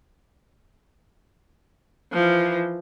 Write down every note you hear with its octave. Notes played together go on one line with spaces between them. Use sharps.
E3 F3